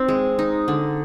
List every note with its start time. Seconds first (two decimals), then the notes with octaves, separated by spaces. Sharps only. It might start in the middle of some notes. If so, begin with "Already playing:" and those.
Already playing: C4 D#4
0.08 G#3
0.39 D#4
0.68 D3